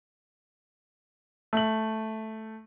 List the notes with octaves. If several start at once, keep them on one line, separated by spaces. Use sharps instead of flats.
A3 F#7